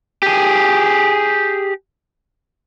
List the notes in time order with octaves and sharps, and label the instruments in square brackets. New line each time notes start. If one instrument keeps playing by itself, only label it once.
[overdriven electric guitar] G4 G#4